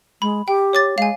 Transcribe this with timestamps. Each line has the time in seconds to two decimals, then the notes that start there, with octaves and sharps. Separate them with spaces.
0.22 G#3 B5
0.48 G4 G5
0.73 C#5 D6 A6
0.98 G#3 F5 G#5